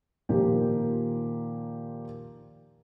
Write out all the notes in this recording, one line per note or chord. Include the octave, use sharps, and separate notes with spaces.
A#2 D#3 F3 A#3 G4